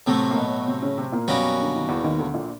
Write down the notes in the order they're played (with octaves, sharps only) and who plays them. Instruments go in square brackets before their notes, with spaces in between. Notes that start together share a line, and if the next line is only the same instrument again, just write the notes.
[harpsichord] A2 F#3 A3 [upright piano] C3 C4
[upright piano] A#3
B2 B3
C3 C4
C#3 C#4
C3 C4
A#2 A#3
[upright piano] F#2 F#3 [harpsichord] B2 G3 A#3 C#4 F#4
[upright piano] D3
D#3
E2 E3
D#2 D#3
D2 D3
A#1 A#2